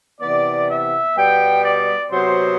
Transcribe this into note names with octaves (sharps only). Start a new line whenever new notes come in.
C3 E3 B3 D5
E5
B2 G3 B3 G5
D5
C3 F#3 B3 C5